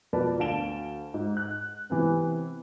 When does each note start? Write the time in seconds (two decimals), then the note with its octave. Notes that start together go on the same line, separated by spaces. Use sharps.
0.13 F2 B2 A#4 B4 D5 A5
0.39 D2 F5 A5 D7 E7 G7
1.14 G#2
1.37 F#6
1.90 C3 E3 B3 C4